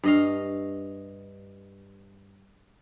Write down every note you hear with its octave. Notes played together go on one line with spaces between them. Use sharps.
G2 D#5 F5